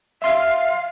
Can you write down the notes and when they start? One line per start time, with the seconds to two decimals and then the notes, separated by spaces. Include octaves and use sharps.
0.22 E5 F5 C6